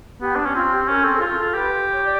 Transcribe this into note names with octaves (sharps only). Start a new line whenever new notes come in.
B3 G4
D4
C#4
C4 F4
G4
C#4 A#4
C4 A4
G#4
F4
A4
F4
G4 B4
C#5
D5